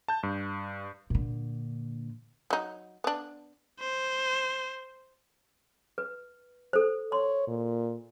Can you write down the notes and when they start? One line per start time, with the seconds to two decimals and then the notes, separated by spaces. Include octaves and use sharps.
0.08 A5 G6
0.23 G2
1.10 A#2 D3
2.50 F#3 D#4
3.04 B3 D4
3.80 C5
5.98 B4
6.73 A4 C5
7.12 C#5 C6
7.48 A#2